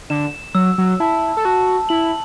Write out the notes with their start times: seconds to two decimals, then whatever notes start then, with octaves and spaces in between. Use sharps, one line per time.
0.10 D3 E7
0.55 F#3 E6
0.78 F#3
1.00 E4 A5
1.37 A4
1.45 F#4 A5
1.89 E4 F#7